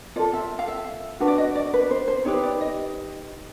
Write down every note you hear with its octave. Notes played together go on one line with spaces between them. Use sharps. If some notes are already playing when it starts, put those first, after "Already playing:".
F4 A4 D5
E5
F5
E5
D4 F#4 B4
D5
D#5
D5
B4
C5
C5
D#4 G4 B4 C#5
D5
D#5